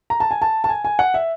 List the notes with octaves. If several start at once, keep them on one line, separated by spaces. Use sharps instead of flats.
A#5
A5
G#5
A5
A5
G#5
G#5
F#5
E5